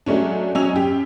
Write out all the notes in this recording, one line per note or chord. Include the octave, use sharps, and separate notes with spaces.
F#3 G#3 A3 C#4 D4
F#3 C#4 D#5 G#5 E6 F7
F#2 G4